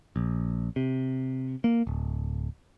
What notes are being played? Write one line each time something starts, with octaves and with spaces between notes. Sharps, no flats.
A#1
C3
A#3
D1